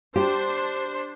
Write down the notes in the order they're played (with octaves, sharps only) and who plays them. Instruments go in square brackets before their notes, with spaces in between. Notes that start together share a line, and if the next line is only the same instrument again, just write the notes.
[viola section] D4 C5 [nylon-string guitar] G4